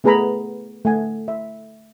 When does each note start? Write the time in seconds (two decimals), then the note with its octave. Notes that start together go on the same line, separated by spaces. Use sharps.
0.04 A3 B3 G#4 B4 A#5 B5
0.85 A3 F#5 G#5
1.28 E5